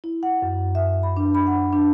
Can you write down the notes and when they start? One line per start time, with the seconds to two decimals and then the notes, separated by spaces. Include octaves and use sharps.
0.04 E4
0.23 F#5
0.42 F#2
0.75 E5
1.03 B5
1.17 D4
1.35 B5
1.47 F#5
1.73 D4